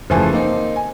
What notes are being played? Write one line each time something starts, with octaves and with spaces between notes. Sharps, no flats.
F#1 C#3 E3 F3 A3 G#5
A#3 C4 D#4
G#5